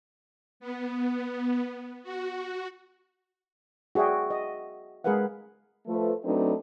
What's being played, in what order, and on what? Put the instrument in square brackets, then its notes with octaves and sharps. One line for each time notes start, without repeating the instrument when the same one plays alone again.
[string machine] B3
F#4
[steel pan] F#4 G#4 D5 E5 G5
D#5
G#3 G#4 A#4 B4 F5 F#5
[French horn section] F3 A3 B4
F#3 A3 C4 D4 D#4 B4